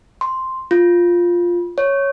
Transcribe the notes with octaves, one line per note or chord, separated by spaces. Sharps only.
C6
F4
C#5